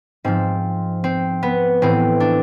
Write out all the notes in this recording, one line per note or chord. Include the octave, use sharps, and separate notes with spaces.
G#2 F3 C4
C4
B3
A2 E3 C4
D4